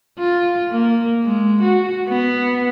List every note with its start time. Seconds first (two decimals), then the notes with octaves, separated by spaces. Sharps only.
0.19 F4
0.71 A#3
1.23 G#3
1.62 F#4
2.09 B3